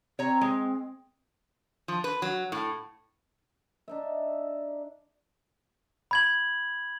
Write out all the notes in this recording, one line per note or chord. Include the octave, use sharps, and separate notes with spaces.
C4 C#5 A#5
G#3
F3
B4
F#3
A2
D4 D#4 E5
B5 G#6 F#7